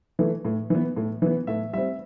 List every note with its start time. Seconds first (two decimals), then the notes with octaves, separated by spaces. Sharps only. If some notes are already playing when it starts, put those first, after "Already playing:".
0.19 E3 A3
0.45 A2
0.70 E3 B3
0.96 A2
1.22 E3 B3
1.47 A2 E5
1.73 G3 C4 E5